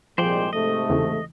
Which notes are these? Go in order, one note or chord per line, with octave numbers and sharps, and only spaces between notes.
C2 A#2 F3 G#3 C5 D5 G5
G#2 C3 A3 D#5
E2 C#3 E3